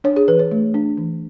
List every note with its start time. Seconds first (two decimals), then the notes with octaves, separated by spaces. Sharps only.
0.04 D4 C#5
0.16 G#4
0.28 E3 B4
0.39 C#5
0.51 A3
0.74 D4
0.97 E3